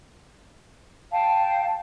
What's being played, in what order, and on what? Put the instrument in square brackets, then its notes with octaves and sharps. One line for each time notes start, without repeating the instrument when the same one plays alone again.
[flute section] F5 G5 A5